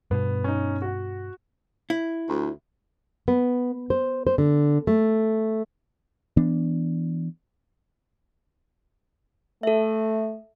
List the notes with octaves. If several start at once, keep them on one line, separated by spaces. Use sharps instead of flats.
G2 B2 B3
C#4 D#4
F#4 F#5
E4
D2
B3
C5
C5
D3
A3
E3 B3 D4
A3 A4 E5